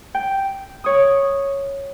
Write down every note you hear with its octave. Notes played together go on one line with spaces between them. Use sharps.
G5
C#5 D#6